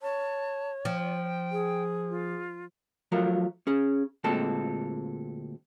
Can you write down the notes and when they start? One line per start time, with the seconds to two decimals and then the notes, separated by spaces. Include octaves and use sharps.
0.02 C#5 A5
0.85 F3 G5
1.51 G#4
2.10 F4
3.12 F3 F#3 A3 F4 A#4
3.67 C#4 G#4
4.24 D2 A#2 G#3 C4 A4 A5